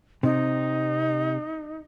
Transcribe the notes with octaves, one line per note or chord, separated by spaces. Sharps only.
C3 C4 D#4